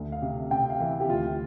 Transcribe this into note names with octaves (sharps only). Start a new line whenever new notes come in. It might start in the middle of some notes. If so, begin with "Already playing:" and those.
Already playing: D2
F5
C3
C3 G5
F5
E3
G4
D2 F4